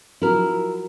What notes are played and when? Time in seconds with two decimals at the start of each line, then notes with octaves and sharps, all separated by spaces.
0.22 F3 F#3 E4 A#4